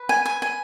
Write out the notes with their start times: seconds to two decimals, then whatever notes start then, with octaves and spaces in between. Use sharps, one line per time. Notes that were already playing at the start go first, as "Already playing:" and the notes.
Already playing: B4
0.09 G#5
0.25 G#5
0.42 G#5